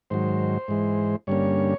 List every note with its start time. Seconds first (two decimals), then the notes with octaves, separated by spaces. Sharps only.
0.10 G#2 D#3 F#3 C5
0.68 G#2 E3 G#3
1.27 G2 D3 G3 A#3 C#4 C#5